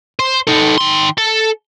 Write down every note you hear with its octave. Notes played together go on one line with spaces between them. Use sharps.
C5
D#4 A4
D#3 C6
A4